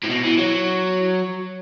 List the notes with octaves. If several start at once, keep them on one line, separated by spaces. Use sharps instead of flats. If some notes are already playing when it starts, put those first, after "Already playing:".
A2
B2
E3
F#3